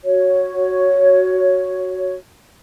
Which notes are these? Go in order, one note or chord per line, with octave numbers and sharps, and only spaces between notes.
F#4 C#5